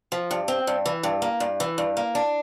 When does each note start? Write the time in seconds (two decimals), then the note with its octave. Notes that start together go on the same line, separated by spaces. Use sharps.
0.12 F3
0.31 G2
0.48 C4
0.67 G2
0.86 E3
1.03 G2
1.22 A#3
1.40 G2
1.60 E3
1.78 G2
1.97 A#3
2.15 D4